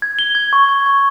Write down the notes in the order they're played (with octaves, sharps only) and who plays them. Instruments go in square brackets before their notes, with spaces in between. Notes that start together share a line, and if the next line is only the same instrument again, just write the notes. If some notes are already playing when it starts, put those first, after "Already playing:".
[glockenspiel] G#6
G7
G#6
C#6
G#6
C#6